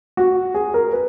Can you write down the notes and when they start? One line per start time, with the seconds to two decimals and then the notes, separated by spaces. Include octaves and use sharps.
0.17 F#4
0.54 G#4
0.74 A#4
0.93 B4